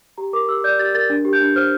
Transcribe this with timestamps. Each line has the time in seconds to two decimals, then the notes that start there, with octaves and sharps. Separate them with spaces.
0.18 G4 A#5
0.33 A#4 D6
0.48 G4 E6
0.64 D5 G6
0.79 G4 A6
0.94 A#4 A6
1.10 D4
1.25 G4
1.33 G6
1.40 D4
1.56 C5 F6